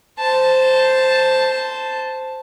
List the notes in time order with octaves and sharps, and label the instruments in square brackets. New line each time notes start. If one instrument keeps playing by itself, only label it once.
[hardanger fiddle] C5 A5